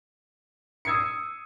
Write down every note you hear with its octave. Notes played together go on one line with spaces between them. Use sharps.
D#6 E6 G#6 C7 C#7